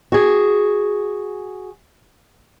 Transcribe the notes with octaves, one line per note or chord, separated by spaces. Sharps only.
F#4 G#4